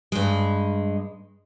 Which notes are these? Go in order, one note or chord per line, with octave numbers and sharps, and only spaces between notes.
G2 G#3